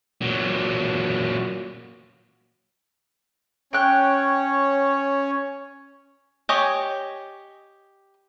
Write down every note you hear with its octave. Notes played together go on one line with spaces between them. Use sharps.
A#2 F#3
C#4 C#5 G5 F#6
G4 C#5 D#5 G#5